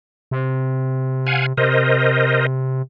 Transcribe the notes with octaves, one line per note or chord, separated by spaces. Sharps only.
C3
F5 F#5 G#5
C3 A#4 C5 D#5